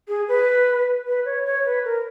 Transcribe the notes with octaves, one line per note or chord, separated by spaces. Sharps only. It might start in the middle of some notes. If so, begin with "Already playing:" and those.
G#4
B4
B4
C#5
C#5
B4
A#4